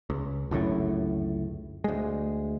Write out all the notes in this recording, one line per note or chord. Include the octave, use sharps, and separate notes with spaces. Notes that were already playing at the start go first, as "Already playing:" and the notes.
C#2
G1 C#2 F#2 A2
D2 G#3